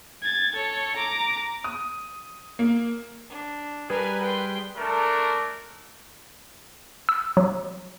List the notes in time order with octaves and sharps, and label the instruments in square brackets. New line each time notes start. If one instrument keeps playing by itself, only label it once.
[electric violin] G#6 A6
A4 C#5
A#5 D6
[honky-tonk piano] D#6
A#3
[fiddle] D4
[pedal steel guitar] G3 G#4 [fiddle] A#4 G#5 [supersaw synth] B4
[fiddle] G5 C6
[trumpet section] A3 D4 A#4
[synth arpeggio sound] E6
F#3